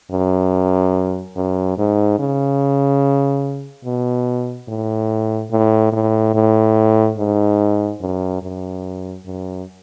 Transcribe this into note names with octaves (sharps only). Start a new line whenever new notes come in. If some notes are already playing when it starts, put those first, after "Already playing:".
F#2
F#2
G#2
C#3
B2
A2
A2
A2
A2
G#2
F#2
F#2
F#2